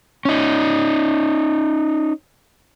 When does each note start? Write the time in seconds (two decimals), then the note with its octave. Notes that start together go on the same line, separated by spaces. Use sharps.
0.25 C#4 D#4